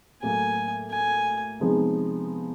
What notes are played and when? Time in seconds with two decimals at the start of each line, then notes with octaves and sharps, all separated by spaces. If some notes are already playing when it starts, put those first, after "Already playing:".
0.23 A2 F#3 A#3 G#5
0.92 G#5
1.60 C3 F3 G#3 B3 D#4